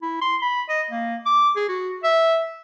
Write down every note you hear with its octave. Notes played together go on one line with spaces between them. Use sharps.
E4
C6
B5
D#5
A#3
D6
G#4
F#4
E5